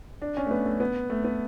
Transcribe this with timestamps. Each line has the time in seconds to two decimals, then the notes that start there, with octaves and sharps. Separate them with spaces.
0.22 D4
0.37 C#4
0.47 A3
0.51 B3
0.66 A3
0.80 B3
1.10 A3
1.24 B3